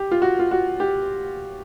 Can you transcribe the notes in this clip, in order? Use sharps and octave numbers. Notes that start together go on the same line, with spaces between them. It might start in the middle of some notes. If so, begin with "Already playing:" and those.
Already playing: G4
F4
F#4
F4
F#4
G4